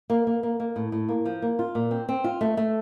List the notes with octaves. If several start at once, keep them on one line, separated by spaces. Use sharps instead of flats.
A#3
A#3
A#3
A#3
A2
A2
A#3
F3
A#3
F4
A#2
C4
C4
F4
A3
A3